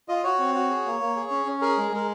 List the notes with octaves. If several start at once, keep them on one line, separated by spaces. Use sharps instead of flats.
F4 D#5
F#4 C#5
C4
F#4
G#4
A#3
A#3
G#4
C#4
C#4
G#4 A#4
G#3
G#3 A#4